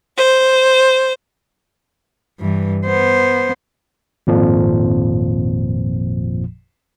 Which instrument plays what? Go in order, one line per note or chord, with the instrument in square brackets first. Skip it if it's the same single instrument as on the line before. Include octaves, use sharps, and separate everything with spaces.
[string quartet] C5
[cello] G2 E3
B3 C5
[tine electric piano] G#1 F2 A#2 F3